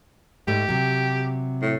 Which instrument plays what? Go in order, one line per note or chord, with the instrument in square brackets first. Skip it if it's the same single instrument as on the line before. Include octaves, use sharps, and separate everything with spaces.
[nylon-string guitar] G#2 A3 [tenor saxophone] G4
[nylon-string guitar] C3 F#3
[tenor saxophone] A2